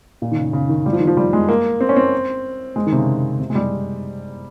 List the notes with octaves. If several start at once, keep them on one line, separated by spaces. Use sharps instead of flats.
A#2
D#3
C#3
C#3
D#3
G3
F3
D#3
F3
G3
G#3
A#3
C4
C#4
C4
G#3
D#3
C3
C#3
C3
G#3
G3